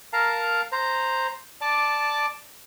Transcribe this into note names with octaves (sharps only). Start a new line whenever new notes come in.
A#4 F5 A5 A#5
C5 A#5
D5 A5 D6